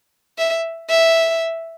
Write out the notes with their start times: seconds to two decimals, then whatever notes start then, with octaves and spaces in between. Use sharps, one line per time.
0.38 E5
0.90 E5